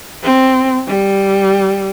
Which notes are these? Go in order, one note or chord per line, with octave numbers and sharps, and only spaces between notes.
C4
G3